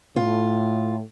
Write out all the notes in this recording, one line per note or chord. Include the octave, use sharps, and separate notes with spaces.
A2 F4